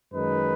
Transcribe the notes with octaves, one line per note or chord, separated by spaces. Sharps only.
F#2 D#3 G#3 D#4 B4